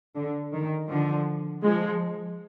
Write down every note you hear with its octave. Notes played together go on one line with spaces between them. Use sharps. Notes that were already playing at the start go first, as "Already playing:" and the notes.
D3
D#3
D3 F3
F3 G#3